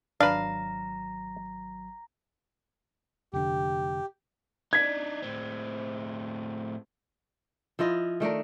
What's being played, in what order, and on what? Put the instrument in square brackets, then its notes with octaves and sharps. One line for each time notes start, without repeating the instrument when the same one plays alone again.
[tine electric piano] G#1 F#3 [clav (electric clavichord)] D4 B4 [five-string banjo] F5 [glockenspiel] A#5 A#6
[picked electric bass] F1 D3 [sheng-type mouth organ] G4
[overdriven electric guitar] D4 D#4 [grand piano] G#6 B6
[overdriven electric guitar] A2 C4
[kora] F3 E4 F4 D#5
D#3 A3 D4 A#4